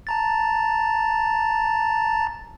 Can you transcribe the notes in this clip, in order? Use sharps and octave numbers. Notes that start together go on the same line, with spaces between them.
A5 A#5 A6